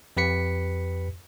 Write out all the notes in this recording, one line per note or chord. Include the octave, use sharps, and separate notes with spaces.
F2 G4 B4 B6 C#7